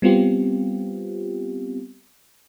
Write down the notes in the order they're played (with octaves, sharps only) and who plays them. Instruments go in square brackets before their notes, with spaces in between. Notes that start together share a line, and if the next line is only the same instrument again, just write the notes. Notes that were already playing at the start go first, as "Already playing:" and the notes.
[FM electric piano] G3 B3 C4 F4 G4